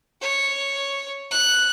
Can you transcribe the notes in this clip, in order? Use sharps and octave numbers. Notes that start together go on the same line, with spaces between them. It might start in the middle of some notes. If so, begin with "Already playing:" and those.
C#5
F#6